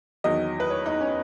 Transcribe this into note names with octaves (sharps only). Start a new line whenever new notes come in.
E2 D#3 F#3 D#5
B4
C#5
D#4
C#4